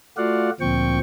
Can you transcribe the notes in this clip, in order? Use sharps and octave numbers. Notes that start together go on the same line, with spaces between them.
A3 F4 F#4 D5 F5 F#5
D2 A#2 F3 C4 G5 C#6